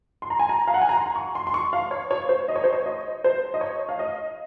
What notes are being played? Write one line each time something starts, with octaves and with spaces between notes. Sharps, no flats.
C6
A#5
G#5
A#5
F5
F#5
G#5
A#5
C6
C#6
C6
C6
C#6
F5
C#5
C#5
C5
D#5
C#5
C5
C#5
D#5
C5
D#5
C#5
F5
D#5